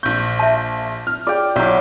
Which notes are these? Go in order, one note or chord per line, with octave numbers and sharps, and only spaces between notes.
A#1 C#6 G6
E5 A5
F6
F4 G#4 D5 G5
B1 F#3 E4 C#5